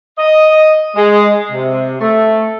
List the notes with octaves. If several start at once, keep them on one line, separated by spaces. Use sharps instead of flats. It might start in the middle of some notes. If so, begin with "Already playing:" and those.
D#5
G#3
C3
A3